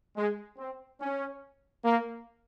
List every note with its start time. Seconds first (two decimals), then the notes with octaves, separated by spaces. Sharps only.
0.16 G#3
0.58 C4
1.00 C#4
1.84 A#3